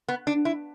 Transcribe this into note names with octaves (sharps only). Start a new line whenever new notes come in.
B3
D4
E4